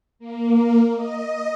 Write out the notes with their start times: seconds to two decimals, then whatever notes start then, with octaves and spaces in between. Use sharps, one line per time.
0.19 A#3
0.95 D#5